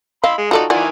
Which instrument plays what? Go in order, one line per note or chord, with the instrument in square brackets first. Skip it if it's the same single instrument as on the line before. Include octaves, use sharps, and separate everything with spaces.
[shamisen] D#5 F5 [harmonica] B5 C6 E6
[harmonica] G#3
[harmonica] D#4 F#4 [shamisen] F4 A4 D5
[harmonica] D#3 E3 G#5 [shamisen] F4 D5 F#5